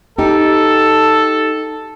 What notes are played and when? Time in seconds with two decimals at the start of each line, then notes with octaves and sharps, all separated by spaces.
0.19 D#4 G4 A4